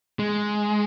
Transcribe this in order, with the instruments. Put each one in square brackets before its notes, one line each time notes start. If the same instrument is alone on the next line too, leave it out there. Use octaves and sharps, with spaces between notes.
[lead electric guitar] G#3